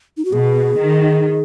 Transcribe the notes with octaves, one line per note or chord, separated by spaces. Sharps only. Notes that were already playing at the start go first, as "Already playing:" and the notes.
D#4
F#4
B2 G#4
D#3